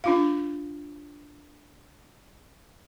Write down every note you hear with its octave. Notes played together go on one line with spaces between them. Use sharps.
D4 F4 F5